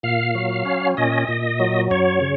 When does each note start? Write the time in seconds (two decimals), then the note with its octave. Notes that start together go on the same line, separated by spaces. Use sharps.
0.03 A#2 F5
0.35 F#3
0.65 C#4
0.97 A#2 D#5
1.28 A#2
1.60 F#3
1.91 F#2 C#5
2.22 C#3